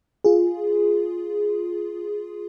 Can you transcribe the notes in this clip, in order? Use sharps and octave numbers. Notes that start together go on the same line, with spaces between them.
F4 G#4